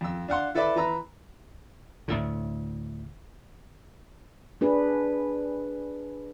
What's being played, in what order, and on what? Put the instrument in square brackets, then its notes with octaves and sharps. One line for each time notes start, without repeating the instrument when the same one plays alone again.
[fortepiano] F2 E6
D4 F5 F#5 C6
E4 A4 B4 D5 E5
E3 B4 A#5 E6
[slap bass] D2 A2 D3
[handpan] D4 G#4 B4